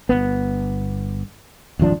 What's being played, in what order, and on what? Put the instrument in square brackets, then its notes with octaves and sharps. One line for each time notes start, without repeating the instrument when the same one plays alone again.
[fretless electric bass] G1 D#2 B3
D#1 G#1 F3 D4